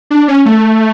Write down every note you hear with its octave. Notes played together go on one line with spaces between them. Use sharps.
D4
C#4
A3